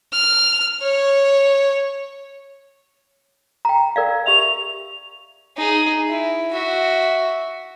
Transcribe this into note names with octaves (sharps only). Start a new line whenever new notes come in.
F6
C#5
G5 A#5
A#4 D5 F5
G4 E5 F7
D#4 G#4
E4
F#4 E5